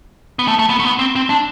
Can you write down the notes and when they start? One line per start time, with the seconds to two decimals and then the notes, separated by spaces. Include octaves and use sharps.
0.39 B3
0.48 A3
0.59 A3
0.70 B3
0.80 A3
0.85 B3
0.99 C4
1.15 C4
1.30 D4